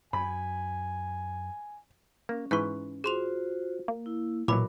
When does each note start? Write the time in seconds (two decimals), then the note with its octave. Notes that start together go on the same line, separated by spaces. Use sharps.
0.13 F#2 G#5 B5
2.29 A#3 C#4
2.51 G#2 E3 B4 C#6 F#6
3.04 F4 F#4 G#4 C5 C6 F7
3.88 A#3
4.06 E4
4.48 B1 A#2 E3 F#3 A#4 B5 D6